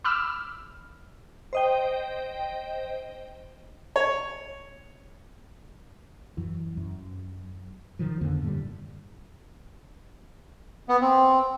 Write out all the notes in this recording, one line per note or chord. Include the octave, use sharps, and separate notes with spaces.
B5 D6 E6 F6
C5 D#5 G5
C#5
F#2 E3
F#2
C3 D#3 F3
F2 D3 A#3 B3
F#2 A2 D3 G3
B3
C4